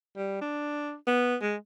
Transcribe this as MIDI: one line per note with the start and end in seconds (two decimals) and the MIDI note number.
0.17 0.39 55
0.42 0.95 62
1.07 1.36 59
1.42 1.56 56